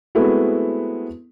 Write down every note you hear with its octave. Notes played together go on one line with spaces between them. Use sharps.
G#3 A3 B3 C4 E4 F#4